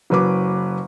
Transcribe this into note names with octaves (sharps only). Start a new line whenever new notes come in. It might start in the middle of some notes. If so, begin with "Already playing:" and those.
F#1 F#3 B4 D6